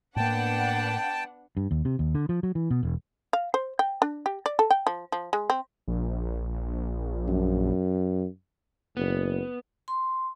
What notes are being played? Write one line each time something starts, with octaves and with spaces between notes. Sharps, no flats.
A2 A#3 B3 D4 F#5 G5 A5
G2
D#2
C3
D#2
D3
F3
F#3
E3
B2
E1
F5
C5
G5
D4
G4
D5
A4
G5
F3
F3
G#3
C4
A#1
F#2
F#1 B3
C6